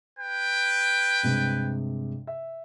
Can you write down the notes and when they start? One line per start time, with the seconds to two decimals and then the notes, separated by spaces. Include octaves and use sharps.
0.18 B4 G5
1.23 G2 C3 G#3
2.27 E5